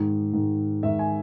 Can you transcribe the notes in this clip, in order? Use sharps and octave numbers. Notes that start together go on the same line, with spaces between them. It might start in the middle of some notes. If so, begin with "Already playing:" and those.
Already playing: G#2 D#3
G#2 D#3
G#2 D#3 E5
G#5